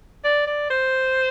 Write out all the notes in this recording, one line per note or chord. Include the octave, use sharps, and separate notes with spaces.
D5
D5
C5